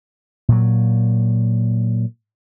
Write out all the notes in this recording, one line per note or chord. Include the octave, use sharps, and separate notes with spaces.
A#2 F#3